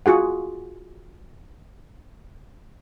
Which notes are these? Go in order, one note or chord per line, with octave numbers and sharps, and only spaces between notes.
F4 F#4 G#4 F#5